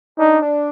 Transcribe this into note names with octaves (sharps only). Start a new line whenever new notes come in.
D4 D#4
D4